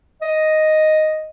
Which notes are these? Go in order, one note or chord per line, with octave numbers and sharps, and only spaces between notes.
D#5